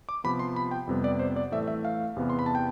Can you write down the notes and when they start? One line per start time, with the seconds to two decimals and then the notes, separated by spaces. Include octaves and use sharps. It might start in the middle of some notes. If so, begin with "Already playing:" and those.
0.09 D6
0.24 C3 F3 B3 B5
0.39 C6
0.56 B5
0.71 G5
0.87 F2 C3 G3 B3
1.04 D5
1.19 C5
1.36 D5
1.52 A2 E3 A3 E5
1.68 E5
1.85 F5
2.16 E2 C3 E3 B3
2.29 C6
2.39 B5
2.46 A5
2.55 G5